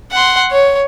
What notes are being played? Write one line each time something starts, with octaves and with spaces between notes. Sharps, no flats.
F#5 C6
C#5